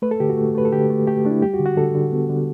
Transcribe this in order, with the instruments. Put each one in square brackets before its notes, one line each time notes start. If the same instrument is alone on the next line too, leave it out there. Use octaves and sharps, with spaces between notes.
[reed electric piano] A3 B4
A4
D3 G4
F#4
A3
A3 B4
A4
D3 G4
A3
A3 G4
A3 D4
E4
G3 G4
F#4
D3
F#4
D3 A4
D3
B3
D3